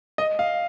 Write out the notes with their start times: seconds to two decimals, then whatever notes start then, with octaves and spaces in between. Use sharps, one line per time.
0.18 D#5
0.39 F5